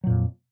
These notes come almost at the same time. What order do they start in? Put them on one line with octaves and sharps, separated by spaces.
F#3 A#2 F2